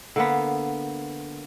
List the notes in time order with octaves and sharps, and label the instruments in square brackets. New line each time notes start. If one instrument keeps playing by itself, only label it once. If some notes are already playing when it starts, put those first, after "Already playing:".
[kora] D3 A#3 B3